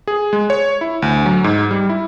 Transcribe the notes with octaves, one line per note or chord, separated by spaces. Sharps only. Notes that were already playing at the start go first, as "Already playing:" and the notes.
G#4
G#3
C#5
E4
D2
F#3
G#2
G3
E4